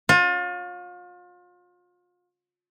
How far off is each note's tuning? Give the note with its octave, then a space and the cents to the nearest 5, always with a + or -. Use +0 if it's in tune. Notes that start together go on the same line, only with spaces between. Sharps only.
F4 +35 C#5 +0